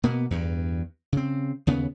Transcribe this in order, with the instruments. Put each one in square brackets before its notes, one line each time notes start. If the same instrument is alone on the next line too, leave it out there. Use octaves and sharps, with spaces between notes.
[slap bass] B2 A#3 B3
E2 G2
C#3 C4
D#2 C#3 B3